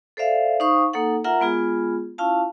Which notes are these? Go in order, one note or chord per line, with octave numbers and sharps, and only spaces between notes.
A4 C5 D5 E5 F5
D#4 C5 F5 C#6 D#6
A#3 D#4 A4 F#5
F4 A#4 E5 F#5 A#5
G#3 B3 F4 G#4
C#4 E4 F4 F5 A5